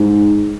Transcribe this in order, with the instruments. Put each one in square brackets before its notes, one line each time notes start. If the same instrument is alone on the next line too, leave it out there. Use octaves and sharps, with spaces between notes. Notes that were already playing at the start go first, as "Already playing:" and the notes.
Already playing: [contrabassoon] G#2